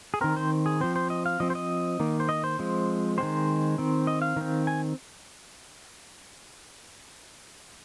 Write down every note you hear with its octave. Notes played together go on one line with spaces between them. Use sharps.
G#4
D#3 C4 A#4
C5
G#4
F3 C4 C5
C5
D#5
F5
F3 C4 D#5
C5
D#5
D#3 A#3
C5
D#5
C5
F3 G#3 C4
D#3 G#3 C4 C5
D#3 C4
D#5
F5
D#3 C4
G#5